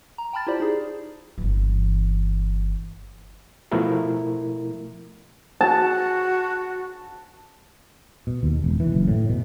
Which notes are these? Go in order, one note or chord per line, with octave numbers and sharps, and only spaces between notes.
A#5
G5 A5 B5 F6 A6
E4 F4 G4 C5 D5
D#4 G#4
G1 E3
B2 F3 A3 E4 A#4
F#4 A5
B2
D#2
E1
E3
F#1
A2
B2